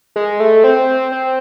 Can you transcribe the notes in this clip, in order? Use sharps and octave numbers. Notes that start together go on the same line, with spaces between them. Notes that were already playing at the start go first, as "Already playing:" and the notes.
G#3
A3
C4
C4